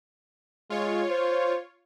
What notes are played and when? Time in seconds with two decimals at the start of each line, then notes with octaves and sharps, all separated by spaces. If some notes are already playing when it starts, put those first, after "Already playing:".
0.70 G#3 F4 C#5
1.10 C5